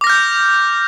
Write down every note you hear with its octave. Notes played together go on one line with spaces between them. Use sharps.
D6 F6 G6 A#6